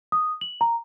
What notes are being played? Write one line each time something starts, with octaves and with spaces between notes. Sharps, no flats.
D#6
F#7
A#5